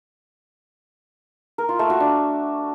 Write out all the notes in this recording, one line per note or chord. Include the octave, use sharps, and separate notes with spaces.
A#4
F4
A3
F#4
D4